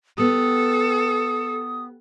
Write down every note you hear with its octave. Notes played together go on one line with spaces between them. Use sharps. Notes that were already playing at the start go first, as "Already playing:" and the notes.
B3 G4 A4 D#6